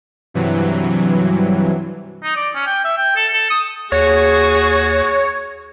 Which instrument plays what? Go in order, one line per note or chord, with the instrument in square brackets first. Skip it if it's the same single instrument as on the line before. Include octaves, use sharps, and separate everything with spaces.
[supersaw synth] G2 C3 E3 F#3
[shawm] D#4
D5
C#4
G5
E5
G5
A4
A4
D#6
[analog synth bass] D#2 [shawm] F#4 [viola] G#4 [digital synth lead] C#5